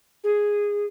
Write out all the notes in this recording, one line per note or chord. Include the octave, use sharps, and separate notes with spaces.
G#4